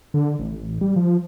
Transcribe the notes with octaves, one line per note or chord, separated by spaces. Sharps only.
D3
A1
G3
F3